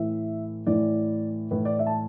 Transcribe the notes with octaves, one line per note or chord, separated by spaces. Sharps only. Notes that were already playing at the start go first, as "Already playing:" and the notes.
Already playing: A2 E3 E5
A2 E3 D5
A2 E3 B4
D5
E5
A5